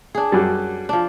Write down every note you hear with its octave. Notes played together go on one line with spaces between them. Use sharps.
D4 G#4
F#2 G3
F3 D4